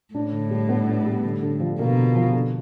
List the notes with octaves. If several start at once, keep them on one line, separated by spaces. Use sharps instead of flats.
A2 D4
D3
G3
B3
D4
G3
D3
D3
F3
B2 A#3
D3
F3
D3